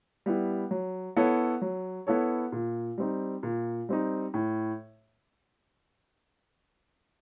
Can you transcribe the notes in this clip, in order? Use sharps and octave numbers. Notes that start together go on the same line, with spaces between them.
G3 B3 E4
F#3
B3 E4 A4 C#5
F#3
B3 E4 A4 C#5
A#2
G3 C4 D#4
A#2
G3 C4 D#4
A2